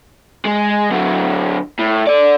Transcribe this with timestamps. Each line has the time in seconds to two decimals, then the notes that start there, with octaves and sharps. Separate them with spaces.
0.45 G#3
0.91 D3 F#3
1.79 A2
2.07 A4 D5